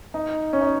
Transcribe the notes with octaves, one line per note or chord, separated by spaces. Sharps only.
D#4
C#4
D#4